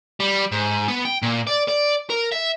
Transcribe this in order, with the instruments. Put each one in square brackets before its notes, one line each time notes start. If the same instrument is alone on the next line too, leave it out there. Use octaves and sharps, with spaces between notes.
[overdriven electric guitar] G3
G#2
B3
G5
A#2
D5
D5
A#4
E5